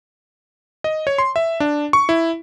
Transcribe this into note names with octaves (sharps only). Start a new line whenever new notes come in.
D#5
C#5
C6
E5
D4
C#6
E4